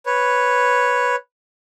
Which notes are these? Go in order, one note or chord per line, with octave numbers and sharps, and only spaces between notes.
B4 C#5